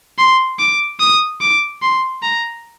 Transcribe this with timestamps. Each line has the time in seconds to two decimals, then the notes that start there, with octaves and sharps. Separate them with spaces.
0.18 C6
0.59 D6
1.00 D#6
1.41 D6
1.82 C6
2.23 A#5